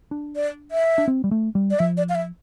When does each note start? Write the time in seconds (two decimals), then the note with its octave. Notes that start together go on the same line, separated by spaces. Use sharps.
0.11 D4
0.36 D5
0.71 E5
0.98 D4
1.08 C4
1.24 G3
1.31 A3
1.55 G3
1.71 D5
1.79 F3 E5
1.97 D5
2.09 F5
2.15 E5